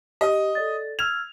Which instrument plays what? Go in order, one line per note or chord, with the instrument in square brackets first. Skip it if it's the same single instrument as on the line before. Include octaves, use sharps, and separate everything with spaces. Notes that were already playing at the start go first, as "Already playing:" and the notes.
[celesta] G4 [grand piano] D#5 D#6
[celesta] A4 D5 A6
[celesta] E6 F6 G#6 [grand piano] F7